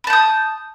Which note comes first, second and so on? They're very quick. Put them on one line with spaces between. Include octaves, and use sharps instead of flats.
B5 A5 G6 D#6